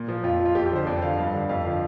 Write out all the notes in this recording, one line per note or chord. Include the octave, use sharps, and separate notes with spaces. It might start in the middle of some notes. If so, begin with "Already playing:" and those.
Already playing: A#2
F3
F2 F4
F3
F4
F2 G4
G4
D3 F3 C5
F2 D5
D3 F3 F5
G2 F5
D3 G3
F2 F5
D3 F3 F5